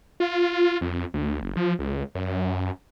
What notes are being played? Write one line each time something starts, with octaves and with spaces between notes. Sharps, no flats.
F4
F2
D2
F#1
F3
C#2
F#2